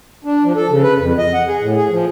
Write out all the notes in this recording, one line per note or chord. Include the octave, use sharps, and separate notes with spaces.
D4
F3
A4
C#3
B4
F2
D#5
F#5
G#4
A2
G#4
F3